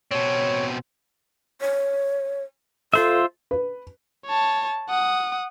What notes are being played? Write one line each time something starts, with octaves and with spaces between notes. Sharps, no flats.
B2 C4 C#5
C#5
F4 A4 C5 E5
B4
C#5 A5
F#5 D#6